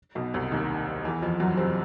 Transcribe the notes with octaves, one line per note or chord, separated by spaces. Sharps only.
B1 B2
C2 C3
D#2 D#3
E2 E3
F2 F3
F#2 F#3
C3 C4